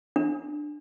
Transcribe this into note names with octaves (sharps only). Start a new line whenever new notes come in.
D4